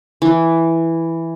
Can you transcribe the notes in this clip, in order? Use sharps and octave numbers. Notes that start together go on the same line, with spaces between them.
E3